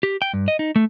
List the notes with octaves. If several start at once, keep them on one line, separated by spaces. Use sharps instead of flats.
G4
G5
G2
D#5
D#4
A3